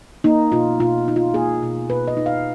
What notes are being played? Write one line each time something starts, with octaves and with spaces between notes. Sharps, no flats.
A#3 D#4
B2 F4
B2 F4
D#4
F4
A#3 G#4
B2
B2 B4
D#5
D#4
F5